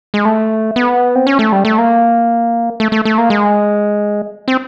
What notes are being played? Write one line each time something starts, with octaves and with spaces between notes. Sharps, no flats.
G#3
A3
B3
C4
C#4
A3
G3
A3
A#3
A3
A3
A3
A#3
G#3
C4